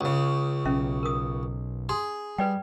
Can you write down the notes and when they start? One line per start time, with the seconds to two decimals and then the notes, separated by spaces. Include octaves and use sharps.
0.01 C#2 C#3
0.66 B1 C#4 E5
1.03 A#4 D#6
1.89 G#4 C6
2.38 G3 B4 D5 G5